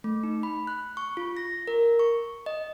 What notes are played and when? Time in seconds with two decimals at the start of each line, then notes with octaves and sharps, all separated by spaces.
0.04 A3
0.23 D#4
0.43 B5
0.67 F#6
0.97 C#6
1.17 F4
1.37 A#6
1.67 A#4
1.99 C#6
2.46 D#5